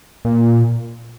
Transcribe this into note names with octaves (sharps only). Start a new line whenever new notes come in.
A#2